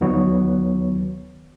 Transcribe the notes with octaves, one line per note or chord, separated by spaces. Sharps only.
D2 D#3 F#3 B3 C#5